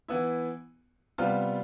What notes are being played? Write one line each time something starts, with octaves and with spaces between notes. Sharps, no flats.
E3 B3 E4
C3 G3 B3 F4